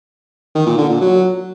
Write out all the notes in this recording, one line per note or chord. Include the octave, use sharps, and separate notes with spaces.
D#3
A#2
D3
A#2
F#3